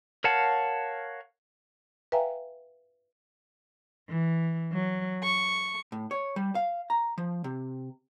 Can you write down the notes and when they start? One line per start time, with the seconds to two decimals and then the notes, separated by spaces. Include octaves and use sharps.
0.24 A#4 C#5 F5 F#5 A5
2.12 B4 E5 F5 G5 G#5 A#5
4.09 E3
4.72 F#3
5.23 C#6
5.92 A2
6.11 C#5
6.36 G3
6.55 F5
6.90 A#5
7.18 F3
7.44 C3